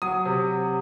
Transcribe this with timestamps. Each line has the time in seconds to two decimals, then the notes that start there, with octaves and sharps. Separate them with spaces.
0.02 F#3 D#6
0.25 C3